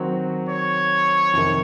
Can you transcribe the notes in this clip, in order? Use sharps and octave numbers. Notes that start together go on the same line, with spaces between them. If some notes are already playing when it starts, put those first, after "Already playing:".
Already playing: D#3 F#3 C4 F#4
C#5
F2 C3 D#3